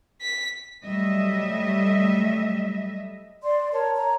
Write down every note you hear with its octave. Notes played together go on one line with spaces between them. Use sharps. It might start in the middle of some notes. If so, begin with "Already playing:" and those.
B6
F#3 G3 A3 D#5 E5
D5 C6
A#4 C#5 A5
C#5 A#5